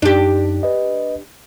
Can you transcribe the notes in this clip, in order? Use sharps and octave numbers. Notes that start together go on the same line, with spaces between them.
F#2 D4 D#4 G4
B4 D#5